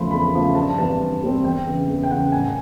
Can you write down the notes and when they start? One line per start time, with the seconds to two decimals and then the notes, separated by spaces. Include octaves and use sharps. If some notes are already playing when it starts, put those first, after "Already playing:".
Already playing: E2 C#3 F3 A3 B5 C6
0.11 E2 B5
0.34 C#3 F3 A3
0.55 G2 A5
0.78 E3 G3 C4 A5
0.99 G2
1.22 E3 G3 C4
1.44 E2 G5
1.67 C#3 E3
1.88 E2
2.03 G5
2.11 C#3 E3 F#5
2.32 A2 G#5
2.45 G#5